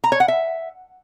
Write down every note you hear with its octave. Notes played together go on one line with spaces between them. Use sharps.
A#5
C#5
F#5
E5